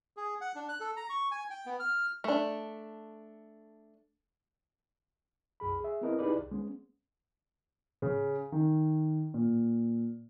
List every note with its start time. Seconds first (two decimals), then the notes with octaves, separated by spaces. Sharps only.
0.17 G#4
0.41 F#5
0.55 D4
0.69 F#6
0.80 A4
0.97 A#5
1.09 C#6
1.31 G#5
1.50 G5
1.66 B3
1.80 F6
2.24 A3 D4
5.60 C2 F#2 G#4 B5
5.80 G#4 E5
6.01 B3 C4 E4 A#4 B4 D#5
6.19 D#4 E4 G4 G#4 B4 D5
6.38 C2
6.51 G#3 B3 C#4
8.02 C#3
8.52 D#3
9.34 A#2